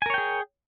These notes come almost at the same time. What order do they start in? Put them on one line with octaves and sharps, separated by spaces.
G#5 A#4 C#5 G5 G#4